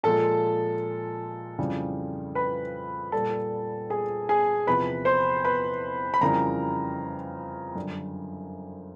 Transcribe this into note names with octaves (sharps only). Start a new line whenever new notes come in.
A#2 F3 G#3 A4 A5
F2 C#3 E3 G3
B4 B5
A#2 G3 A4 A5
G#4 G#5
G#4 G#5
E2 C3 F3 B4 B5
C5 C6
B4 B5
B5
F2 C#3 E3 G3 A#4 A#5
F#2 D3 G3